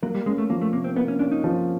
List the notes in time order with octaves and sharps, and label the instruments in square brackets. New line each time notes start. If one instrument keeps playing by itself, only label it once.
[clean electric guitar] F#3 [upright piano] A#3
[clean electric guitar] G3
[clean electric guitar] G#3 [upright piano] C#4
[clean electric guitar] A3
[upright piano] F3 [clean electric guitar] A#3
[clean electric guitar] A3
[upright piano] C3 [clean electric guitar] A#3
[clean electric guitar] C4
[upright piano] A#3 [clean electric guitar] B3
[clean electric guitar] C#4
[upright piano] C#4 [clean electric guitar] D4
[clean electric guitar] D#4
[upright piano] F3